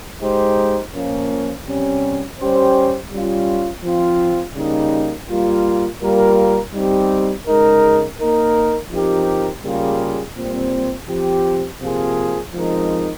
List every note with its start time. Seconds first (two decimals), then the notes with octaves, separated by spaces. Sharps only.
0.22 G#3 D#4 G4 C5
0.94 A#2 F3 A#3 C#4
1.67 C3 G3 C#4
2.39 G3 C#4 G4 C5
3.11 G3 C#4 F4
3.84 F3 C4 F4
4.56 C#3 G3 A#3 D#4
5.29 G3 A#3 F4
6.01 G3 A#3 F4 A#4
6.74 G3 C4 D#4 G4
7.46 C#3 G#3 D#4 A#4
8.19 A#3 D#4 A#4
8.91 F3 C4 D#4 G4 A#4
9.64 C#3 G3 A#3 F4 G#4
10.36 A#2 G3 C4
11.09 F3 C4 G4
11.81 C3 F3 A#3 F4 G#4
12.54 F3 G#3 C4 D#4 A#4